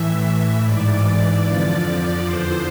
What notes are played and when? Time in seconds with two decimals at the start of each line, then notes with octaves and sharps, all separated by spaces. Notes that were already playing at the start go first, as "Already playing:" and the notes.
Already playing: A2 E3 E5
0.61 G#2 E3 D5
1.41 F2 D3 F3
2.21 E2 D3 F3 C5